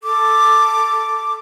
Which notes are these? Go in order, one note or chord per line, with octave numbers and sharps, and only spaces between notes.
A4 D6